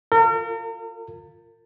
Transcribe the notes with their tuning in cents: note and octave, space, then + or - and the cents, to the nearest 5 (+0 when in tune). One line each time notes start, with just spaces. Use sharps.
F4 +0 A#4 -40